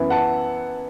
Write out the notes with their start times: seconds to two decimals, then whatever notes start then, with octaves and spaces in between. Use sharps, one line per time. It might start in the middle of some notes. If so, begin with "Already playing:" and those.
Already playing: F#2 E3 B3 E4
0.10 F#5 A5